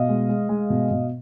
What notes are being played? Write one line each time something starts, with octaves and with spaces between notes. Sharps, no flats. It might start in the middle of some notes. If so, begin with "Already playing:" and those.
Already playing: B2 D#5 F5
G#3
G#3
G#3
B2
B2